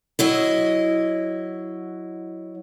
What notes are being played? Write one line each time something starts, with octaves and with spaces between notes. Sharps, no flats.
F#3 E4 D#5